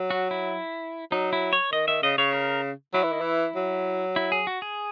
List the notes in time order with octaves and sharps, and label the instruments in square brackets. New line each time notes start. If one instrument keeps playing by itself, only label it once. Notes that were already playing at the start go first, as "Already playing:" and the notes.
Already playing: [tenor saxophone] F#3
[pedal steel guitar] F#4
E4
[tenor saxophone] F#3 [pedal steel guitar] D#4
[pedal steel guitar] E4
C#5
[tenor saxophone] D#3 [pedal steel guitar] D#5
[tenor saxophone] D#3 [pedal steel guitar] E5
[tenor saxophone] C#3 [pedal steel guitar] D#5
[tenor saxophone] C#3 [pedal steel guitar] C#5
[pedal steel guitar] A#4
[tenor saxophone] F#3 [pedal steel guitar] E4
[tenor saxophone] E3
D#3
E3
F#3
[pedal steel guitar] E4
G#4
F#4
G#4